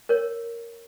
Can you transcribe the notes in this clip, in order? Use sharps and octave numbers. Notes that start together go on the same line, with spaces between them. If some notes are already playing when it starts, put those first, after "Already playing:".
A#4 C#5